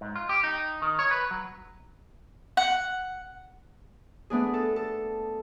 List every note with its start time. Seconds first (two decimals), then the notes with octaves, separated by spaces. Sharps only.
0.01 G#2
0.15 F4
0.29 G4
0.43 D#4
0.82 D#3
0.99 C#5
1.11 B4
1.31 F#3
2.57 F#5
4.30 A3 B3 D4 G#4
4.54 A4
4.76 A4